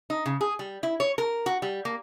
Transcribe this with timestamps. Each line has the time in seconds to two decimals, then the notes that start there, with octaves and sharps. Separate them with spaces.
0.10 D#4
0.26 C#3
0.41 G#4
0.59 G3
0.83 E4
1.00 C#5
1.18 A#4
1.46 F#4
1.62 G3
1.85 A#3